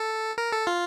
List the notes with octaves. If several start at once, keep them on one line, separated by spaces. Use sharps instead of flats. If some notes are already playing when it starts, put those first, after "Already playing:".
Already playing: A4
A#4
A4
F4